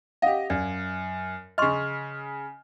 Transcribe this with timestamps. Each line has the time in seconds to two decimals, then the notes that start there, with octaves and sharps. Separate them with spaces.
0.22 C#4 G4 D#5 F5 F#5
0.50 F#2 D5
1.58 C#3 D#5 C6 C#6 F6